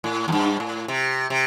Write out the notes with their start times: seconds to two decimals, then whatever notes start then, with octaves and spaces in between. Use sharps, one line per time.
0.04 A2
0.28 E2
0.32 G2
0.60 A2
0.88 C3
1.30 C3